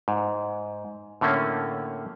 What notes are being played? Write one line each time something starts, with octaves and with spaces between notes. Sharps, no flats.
G#2
A2 D3 A3 A#3 C#4